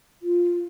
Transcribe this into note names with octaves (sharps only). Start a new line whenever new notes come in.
F4